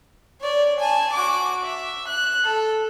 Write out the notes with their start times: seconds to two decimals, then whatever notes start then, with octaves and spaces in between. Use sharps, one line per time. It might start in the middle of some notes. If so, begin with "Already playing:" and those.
0.41 C#5 D5
0.79 G#5 A5
1.13 F#4 D6
1.64 E5
2.08 F#6
2.44 A4